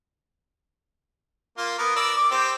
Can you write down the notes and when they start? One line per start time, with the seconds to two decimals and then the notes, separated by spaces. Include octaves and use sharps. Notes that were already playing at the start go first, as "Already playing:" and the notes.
1.58 A#3 F4
1.78 B3 A#4
1.96 A#4 D5 E6
2.17 D6
2.31 C4 G4 C5